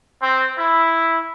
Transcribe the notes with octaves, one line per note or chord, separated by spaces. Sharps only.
C4
E4